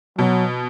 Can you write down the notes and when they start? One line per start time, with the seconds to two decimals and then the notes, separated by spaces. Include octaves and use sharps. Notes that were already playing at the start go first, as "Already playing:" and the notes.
0.19 B2 F#3